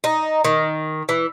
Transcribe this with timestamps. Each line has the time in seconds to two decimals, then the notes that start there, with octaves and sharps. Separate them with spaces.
0.04 D#4
0.45 D#3
1.09 E3